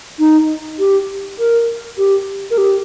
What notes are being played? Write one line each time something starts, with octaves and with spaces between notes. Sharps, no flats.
D#4
G4
A#4
G4
A#4
G4